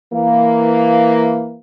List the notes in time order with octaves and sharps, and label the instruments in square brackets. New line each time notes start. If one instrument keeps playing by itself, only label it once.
[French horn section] E3 A#3